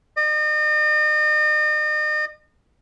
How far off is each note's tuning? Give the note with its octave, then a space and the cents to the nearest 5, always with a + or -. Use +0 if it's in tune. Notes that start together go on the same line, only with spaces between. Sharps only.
D#5 -40